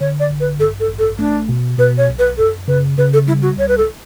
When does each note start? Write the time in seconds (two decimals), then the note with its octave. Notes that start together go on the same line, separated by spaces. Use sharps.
0.01 D3 C#5
0.20 D5
0.30 A1
0.40 B4
0.59 G2 A4
0.80 A4
0.89 A1
0.99 A4
1.19 A3 D4
1.49 B2
1.78 B2 B4
1.98 C#5
2.09 B1
2.19 B4
2.38 F#2 A4
2.68 C#3 B4
2.98 C#3 B4
3.13 A4
3.27 G3 E4
3.42 F#4
3.57 C#2 C#5
3.68 B4
3.78 A4